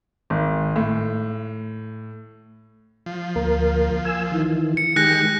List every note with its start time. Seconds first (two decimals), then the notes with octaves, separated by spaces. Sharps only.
0.30 G#1
0.76 A2
3.06 F3
3.36 D2 A#3 A#4
4.05 G#5 E6
4.32 D#3 E3
4.77 C#7
4.96 D#3 G#3 G4 F#6 A#6 C#7